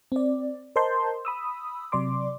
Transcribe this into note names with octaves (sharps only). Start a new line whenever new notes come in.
C4 D5
A#4 C5 D#5 A5 C6 G6
B5 D#6 E6
C3 F#3 D5 C6 D6